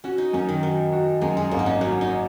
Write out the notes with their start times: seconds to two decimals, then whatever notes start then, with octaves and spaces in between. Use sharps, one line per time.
0.04 C#4 F#4
0.18 D#4
0.33 F#2 C#4
0.49 D#3
0.63 D#3 F#4
0.93 F#4
1.21 F#2 G#3
1.37 G#3
1.51 G#1 A#3
1.59 D#4
1.66 C#4
1.81 F#3 C#4
2.01 D#4